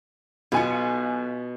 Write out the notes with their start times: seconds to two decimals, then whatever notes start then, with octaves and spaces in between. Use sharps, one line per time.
0.52 B1 B2 F4 G#5 C#7